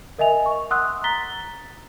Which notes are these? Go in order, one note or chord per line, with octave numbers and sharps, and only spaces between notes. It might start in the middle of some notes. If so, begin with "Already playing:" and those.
A#4 D#5 E5 G#5 F7
C#6
F#5 C6 D#6 E6 F#6
A#5 A6 B6 G7